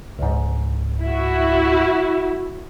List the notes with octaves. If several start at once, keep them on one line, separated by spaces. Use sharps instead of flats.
C#2 G#2
E4 F#4